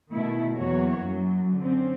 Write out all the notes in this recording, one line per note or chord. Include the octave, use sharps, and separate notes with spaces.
B2 D#3 A3 E4
E2 E3 F#3 A#3 F#4 C#5
F#2 F#3
D3 C4 C#4